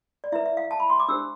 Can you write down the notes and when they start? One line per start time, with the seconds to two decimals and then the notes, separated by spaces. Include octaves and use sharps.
0.24 D5
0.32 E4 B4 E5
0.46 E5
0.57 F5
0.71 A5
0.80 B5
0.90 C6
1.00 D6
1.08 D4 G4 C5 E6